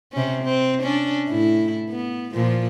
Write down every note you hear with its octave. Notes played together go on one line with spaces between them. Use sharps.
C3 C#4
C4
C#4 D4
A2 E4
B3
A#2 F3